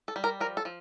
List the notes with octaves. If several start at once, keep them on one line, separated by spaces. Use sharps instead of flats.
A4
G3
A#4
F3 A#4
A4
F3